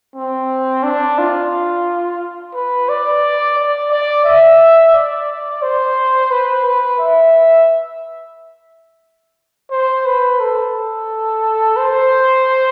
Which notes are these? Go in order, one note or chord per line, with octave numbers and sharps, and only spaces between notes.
C4
D4
F4
B4
D5
D5
D5
E5
D5
C5
B4
B4
E5
C5
B4
A4
C5